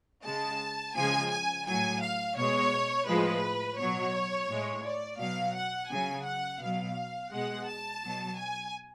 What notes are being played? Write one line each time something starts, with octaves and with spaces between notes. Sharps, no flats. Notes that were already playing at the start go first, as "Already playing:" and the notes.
C#3 G#3 A5
C#3 F3 G#3 G#5
G#5
A2 F#3 G#5
F5
B2 G#3 C#5
A2 F3 G#3 B4
B2 F#3 C#5
A2 G#3
D5
B2 F#3 F5
F#5
C#3 F#3 G#5
F#5
B2 F#3 F5
B2 G#3 F#5
A5
B2 F#3
G#5